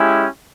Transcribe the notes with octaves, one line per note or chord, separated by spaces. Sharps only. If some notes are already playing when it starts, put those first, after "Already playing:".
Already playing: G#3 C#4 E4 G4